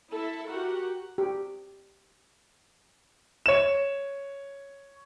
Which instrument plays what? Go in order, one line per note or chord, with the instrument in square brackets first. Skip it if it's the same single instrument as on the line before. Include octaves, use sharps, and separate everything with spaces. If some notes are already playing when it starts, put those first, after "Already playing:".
[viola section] E4 A4 E5
F#4 G4 A#4 F#5
[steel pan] G4
[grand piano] C#5 E7